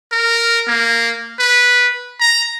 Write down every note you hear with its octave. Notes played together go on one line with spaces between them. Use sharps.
A#4
A#3
B4
A#5